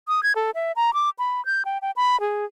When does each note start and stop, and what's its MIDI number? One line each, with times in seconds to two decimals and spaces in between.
0.08 0.23 87
0.23 0.33 92
0.36 0.51 69
0.55 0.72 76
0.76 0.94 82
0.94 1.10 86
1.19 1.44 83
1.45 1.63 91
1.65 1.78 79
1.82 1.91 79
1.96 2.20 83
2.21 2.45 68